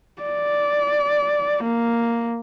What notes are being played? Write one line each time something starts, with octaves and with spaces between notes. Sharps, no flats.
D5
A#3